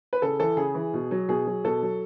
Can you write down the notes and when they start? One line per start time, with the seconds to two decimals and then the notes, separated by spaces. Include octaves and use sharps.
0.13 B4
0.22 C#3 A4
0.40 E3 A4
0.57 C#3 G#4
0.75 E3
0.94 B2
1.11 F#3
1.28 B2 G#4
1.46 F#3
1.64 B2 A4
1.82 F#3